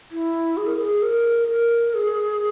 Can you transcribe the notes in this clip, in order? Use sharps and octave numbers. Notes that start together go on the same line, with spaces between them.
E4
G#4
A#4
G#4
A#4
A#4
G#4